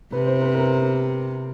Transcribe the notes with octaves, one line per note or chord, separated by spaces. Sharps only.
C3 B4
C5
B4
A#4